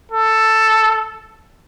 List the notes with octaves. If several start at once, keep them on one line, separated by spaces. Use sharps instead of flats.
A4